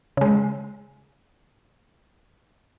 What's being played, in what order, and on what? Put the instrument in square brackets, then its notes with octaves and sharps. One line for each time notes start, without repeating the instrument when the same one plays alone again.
[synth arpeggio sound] C#3 G#3